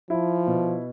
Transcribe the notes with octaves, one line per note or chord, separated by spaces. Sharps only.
F3 E4
B2